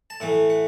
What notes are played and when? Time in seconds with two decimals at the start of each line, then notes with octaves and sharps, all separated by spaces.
0.10 A5
0.20 A2 E3 A3 F#5
0.50 F#5